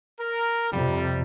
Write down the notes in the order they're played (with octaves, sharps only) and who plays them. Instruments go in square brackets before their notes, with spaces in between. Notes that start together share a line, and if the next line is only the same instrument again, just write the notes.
[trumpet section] A#4
[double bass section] F2 C3 [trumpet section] G3